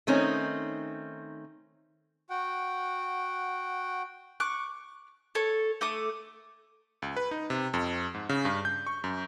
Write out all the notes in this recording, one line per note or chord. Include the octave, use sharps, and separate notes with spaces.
D#3 A3 C4 C#4 D#4
F#4 F#5 G5
C#6 D6 F#6
A4 C#5
A3 D6 D#6
C#2
B4
D#4
C3
F2
G#2
C#3
G2
G6
C#6
F#2